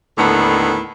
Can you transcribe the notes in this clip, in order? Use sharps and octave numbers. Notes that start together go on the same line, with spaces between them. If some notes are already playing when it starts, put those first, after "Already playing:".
D#2 A2 D3 D#3 B3